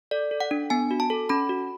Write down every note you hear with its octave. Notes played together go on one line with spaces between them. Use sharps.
A4 D5
A4
F#5
D4
B3 G#5
F#4
A5
A4
C#4 B5
F#4